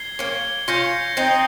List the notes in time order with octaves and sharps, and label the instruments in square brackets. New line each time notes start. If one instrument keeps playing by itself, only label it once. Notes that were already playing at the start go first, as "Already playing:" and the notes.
Already playing: [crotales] G#6 C7 G7
[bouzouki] A#3 C#4
[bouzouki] C#4 F4 [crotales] G6 A#6 C#7
[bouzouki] C4 D#4